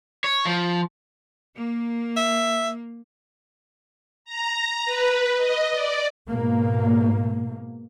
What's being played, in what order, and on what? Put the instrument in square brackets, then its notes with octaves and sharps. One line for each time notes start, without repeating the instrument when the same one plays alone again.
[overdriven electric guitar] C#5
F3
[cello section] A#3
[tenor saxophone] E5
[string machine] A#5
B4
D#5
D5
[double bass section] G#2 B2 A#3